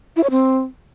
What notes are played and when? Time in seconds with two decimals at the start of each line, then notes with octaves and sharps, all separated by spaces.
0.16 E4
0.23 C#5
0.30 C4